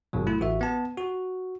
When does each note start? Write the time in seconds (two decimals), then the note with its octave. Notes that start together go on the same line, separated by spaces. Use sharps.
0.13 G1 G2 B2 F#3
0.27 A3 E4
0.40 A1 F#4 E5
0.61 B3 A5
0.98 F#4